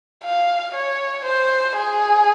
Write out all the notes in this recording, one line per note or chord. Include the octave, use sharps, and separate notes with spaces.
F5
C#5
C5
G#4